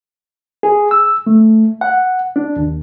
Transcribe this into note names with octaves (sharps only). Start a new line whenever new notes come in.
G#4
E6
A3
F#5
D4
D#2